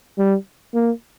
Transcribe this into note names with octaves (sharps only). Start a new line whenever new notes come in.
G3
A#3